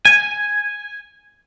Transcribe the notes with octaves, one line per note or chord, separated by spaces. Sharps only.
G#5